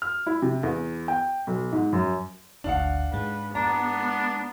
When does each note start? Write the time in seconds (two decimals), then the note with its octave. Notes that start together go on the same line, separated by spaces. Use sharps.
0.02 F6
0.26 E4
0.42 C3
0.63 E2
1.08 G5
1.47 B1
1.72 G#2
1.92 F#2
2.64 G#1 D2 D4 F5 F#5
3.13 G#2 G#3 B4
3.55 B3 D4 A#5